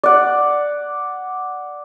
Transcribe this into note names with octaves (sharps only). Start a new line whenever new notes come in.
D5 F#5